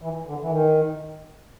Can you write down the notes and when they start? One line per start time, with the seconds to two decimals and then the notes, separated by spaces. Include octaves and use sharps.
0.02 E3
0.27 D3
0.42 E3
0.51 D#3